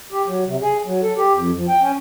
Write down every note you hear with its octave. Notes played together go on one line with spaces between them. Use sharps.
G4
F#3
C3
G#4
F#3
A4
G4
F2
F3
G5
C#4